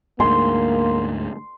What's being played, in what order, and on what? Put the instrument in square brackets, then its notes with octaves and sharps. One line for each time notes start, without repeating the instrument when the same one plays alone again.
[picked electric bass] D2 G#2 [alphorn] A#3 [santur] C6